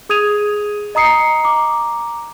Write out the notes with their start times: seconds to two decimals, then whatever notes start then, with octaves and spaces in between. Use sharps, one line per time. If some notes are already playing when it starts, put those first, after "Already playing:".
0.09 G#4 D#6 G#6 D#7 F7
0.95 D#5 A#5 D#6 C7 C#7
1.44 A#5 D6